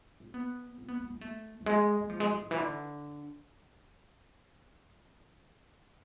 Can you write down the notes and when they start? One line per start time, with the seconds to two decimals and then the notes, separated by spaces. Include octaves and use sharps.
0.20 C4
0.34 B3
0.78 C4
0.88 B3
1.00 B3
1.10 B3
1.21 A3
1.61 F3
1.66 G#3
2.01 G#3
2.09 F3
2.20 G#3
2.31 F3
2.43 D3
2.51 E3
2.58 D3